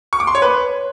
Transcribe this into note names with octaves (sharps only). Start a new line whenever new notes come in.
C#6
D6
C6
C#5
B4